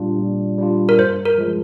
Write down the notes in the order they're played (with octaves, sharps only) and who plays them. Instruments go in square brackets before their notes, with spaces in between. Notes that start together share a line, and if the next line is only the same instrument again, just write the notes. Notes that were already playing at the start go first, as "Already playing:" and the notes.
Already playing: [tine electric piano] A#2 G3 D4 F4
A#2
G3 D4 F4
[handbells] A#4
[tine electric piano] G2 [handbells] C5
[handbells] A#4
[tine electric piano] F3 G#3